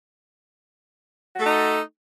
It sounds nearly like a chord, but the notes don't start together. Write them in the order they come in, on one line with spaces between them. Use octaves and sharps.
F#4 A3 A4 D#4